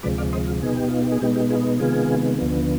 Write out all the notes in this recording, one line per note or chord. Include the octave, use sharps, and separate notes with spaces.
D2 C3 F3 G#3 B4 D5
D5 F5
C5 D#5
F4
B2 B3 D#4 G#4
G4
F4
G4
G#4
B2 G#3 B3 D#4 G4
G4
F4 G#4
C3 D#3 G#3 B3 F4 G#4
D2 D3 F3 B3